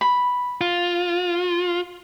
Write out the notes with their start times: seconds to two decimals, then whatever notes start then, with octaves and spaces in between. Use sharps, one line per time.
0.01 B5
0.61 F4